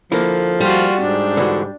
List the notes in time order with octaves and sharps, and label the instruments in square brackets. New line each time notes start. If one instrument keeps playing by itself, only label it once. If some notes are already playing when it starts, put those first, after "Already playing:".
[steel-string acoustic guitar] D3 [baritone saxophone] F3 [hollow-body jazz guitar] A#3 E4
[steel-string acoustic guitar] G3 [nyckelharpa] F4 F#4
[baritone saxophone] G#2 [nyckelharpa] D4
[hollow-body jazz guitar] D3 E3 F#4